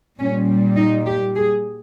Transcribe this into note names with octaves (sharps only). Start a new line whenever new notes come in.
A#2 G3 C#4
D#4
G4
G#4